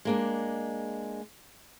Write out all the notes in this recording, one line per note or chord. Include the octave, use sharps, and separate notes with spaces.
G#3 A#3 D4